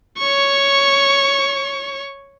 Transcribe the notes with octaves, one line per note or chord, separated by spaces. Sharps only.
C#5 C#6